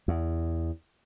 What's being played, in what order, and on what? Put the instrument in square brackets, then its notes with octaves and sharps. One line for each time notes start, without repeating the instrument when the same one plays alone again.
[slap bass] E2